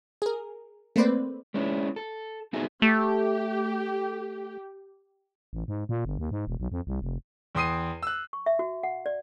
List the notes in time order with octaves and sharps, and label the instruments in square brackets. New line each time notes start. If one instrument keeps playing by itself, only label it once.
[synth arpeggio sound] G#4 A#4
A3 A#3 C4 B4 C5 D5
[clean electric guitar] G#3 C#4 D4 E4
A4
B3 D#4 F#4 G#4 A4 E5
[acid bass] A3 [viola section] G4
[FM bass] A1
G#2
A#2
G1
D#2
G#2
E1
B1
F2
C2
F1
[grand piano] E2 G5 C6 D#6 C7 D#7
E6 F#6
[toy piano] C#6
E5
F#4
F#5
D5